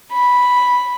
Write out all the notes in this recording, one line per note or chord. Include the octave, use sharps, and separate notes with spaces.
B5